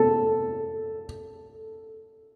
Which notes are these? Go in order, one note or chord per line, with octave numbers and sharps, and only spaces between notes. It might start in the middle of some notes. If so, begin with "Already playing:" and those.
Already playing: A4